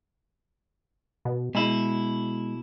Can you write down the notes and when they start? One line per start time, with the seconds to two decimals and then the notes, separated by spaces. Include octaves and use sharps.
1.25 B2
1.55 B2 G#3 E4